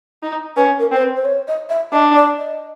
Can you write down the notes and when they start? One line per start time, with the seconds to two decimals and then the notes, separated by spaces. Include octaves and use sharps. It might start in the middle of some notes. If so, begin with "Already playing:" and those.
0.23 D#4
0.56 C#4 B4
0.79 A#4
0.91 C4 C5
1.02 B4
1.16 C5
1.25 C#5
1.48 D#5
1.69 E5
1.92 D4 D#5
2.15 D5
2.38 D#5